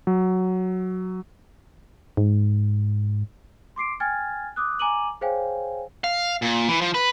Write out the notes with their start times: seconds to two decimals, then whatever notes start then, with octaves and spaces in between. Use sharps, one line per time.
0.07 F#3
2.17 G#2
3.76 C6 D6 C7 D7
4.00 G5 G#5 F6 G#6 A6
4.56 D6 D#6 F#6
4.79 G#5 A#5 D6 D#7 F#7
5.21 G#4 C5 C#5 F5 G5 G#5
6.04 F5
6.42 A#2
6.69 E3
6.81 F3
6.94 B4